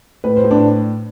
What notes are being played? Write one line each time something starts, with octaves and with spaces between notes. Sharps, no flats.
A2 B4
C5
A2
D4